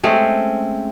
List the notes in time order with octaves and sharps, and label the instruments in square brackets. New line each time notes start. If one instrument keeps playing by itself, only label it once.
[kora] G#3 A3 C4 C#4